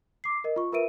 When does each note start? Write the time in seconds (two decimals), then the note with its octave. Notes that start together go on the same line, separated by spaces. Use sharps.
0.24 D6 C7
0.44 A#4 D#5
0.56 F4 C#6
0.72 F4 A#4 B4 E5 D7 D#7